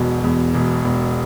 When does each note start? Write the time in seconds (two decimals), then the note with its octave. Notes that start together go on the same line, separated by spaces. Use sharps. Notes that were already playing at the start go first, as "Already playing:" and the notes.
Already playing: E1 E2 B2
0.24 E2
0.54 E1
0.85 E1